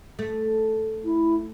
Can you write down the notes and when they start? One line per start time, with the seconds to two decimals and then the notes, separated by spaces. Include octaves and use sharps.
0.19 A3
1.05 E4